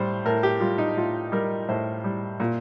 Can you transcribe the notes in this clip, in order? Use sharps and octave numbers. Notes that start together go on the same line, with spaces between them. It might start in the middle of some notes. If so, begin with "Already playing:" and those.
Already playing: A2 G3 C5
A2 A#4
G4
G3 F4
D#4
A2 F4
G3 A#4
A2 C5
G3
A#2